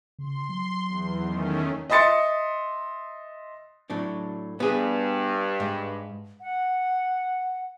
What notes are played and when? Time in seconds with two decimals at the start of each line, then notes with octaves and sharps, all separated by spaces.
0.19 C#3 C6
0.49 F#3
0.86 E2
1.22 D#3 A3 C#4
1.90 D#5 E5 C6 A6 C#7
3.90 A2 F#3 D4
4.60 G2 B3 G#4
5.60 G#2
6.41 F#5